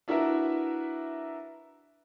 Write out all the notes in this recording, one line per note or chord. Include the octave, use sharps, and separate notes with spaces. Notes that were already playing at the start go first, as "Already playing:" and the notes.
D4 E4 F#4 A#4 B4 E5